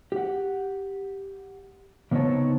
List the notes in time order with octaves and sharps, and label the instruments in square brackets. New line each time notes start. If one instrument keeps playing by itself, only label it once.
[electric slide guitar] G4 F#5
C#3 B3 C4 D#4 C#5 A5